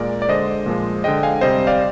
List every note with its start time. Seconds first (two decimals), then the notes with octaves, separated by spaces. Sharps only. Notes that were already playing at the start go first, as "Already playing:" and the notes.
Already playing: A#2 G#3 A#4 D5
0.22 D5
0.29 D3 G#3 C5 D#5
0.66 A#2 F3 G#3
1.04 D3 G#3 D#5 G5
1.23 F5 G#5
1.41 C3 G3 C5 D#5
1.67 D5 F5